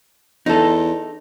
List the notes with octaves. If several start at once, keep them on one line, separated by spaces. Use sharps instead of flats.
E2 D#4 A4